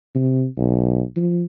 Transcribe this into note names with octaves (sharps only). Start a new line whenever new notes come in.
C3
B1
F3